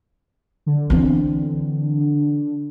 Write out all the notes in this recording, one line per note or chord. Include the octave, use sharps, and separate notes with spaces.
D3
E3 C4